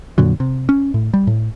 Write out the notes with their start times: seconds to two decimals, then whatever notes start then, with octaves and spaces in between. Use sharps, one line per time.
0.18 F2 A#2 D3 F#3
0.40 C3
0.69 C#4
0.94 A2
1.14 G3
1.27 A2